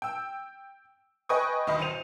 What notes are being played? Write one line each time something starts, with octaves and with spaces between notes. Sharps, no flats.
G5 E6
B4 D#5 G5 G#5 C#6 D#6
D2 D#3 D#5 B5
A1 C5 D#7 F7